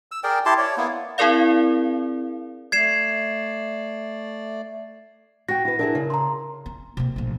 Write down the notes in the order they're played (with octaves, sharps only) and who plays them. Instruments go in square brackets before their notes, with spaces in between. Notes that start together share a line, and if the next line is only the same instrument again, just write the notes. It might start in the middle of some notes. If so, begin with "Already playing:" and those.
[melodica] E6
G#4 A#4 D5 G5
E4 G4 A5 C6
C#5 D5
A#3 B3 E4
[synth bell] C4 E4 G#4 A#4 D5 F5
[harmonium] A3 D5 [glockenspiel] G#6 C7 E7
[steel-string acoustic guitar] F#4 G5 [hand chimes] A#6
[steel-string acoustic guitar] E4 B4
[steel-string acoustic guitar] D4 E4 G#4 [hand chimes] A#4
[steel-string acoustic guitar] C#3
[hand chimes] A#5 C6
[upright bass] C#4
C3 A#3
A#1 A3